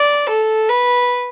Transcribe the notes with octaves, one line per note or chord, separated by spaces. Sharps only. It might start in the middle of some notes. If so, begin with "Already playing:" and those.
Already playing: D5
A4
B4